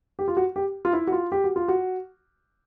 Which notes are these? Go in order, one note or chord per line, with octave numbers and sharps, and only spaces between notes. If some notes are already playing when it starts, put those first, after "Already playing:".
G4
F4
F#4
G4
F4
E4
F#4
F4
G4
F#4
F4
F#4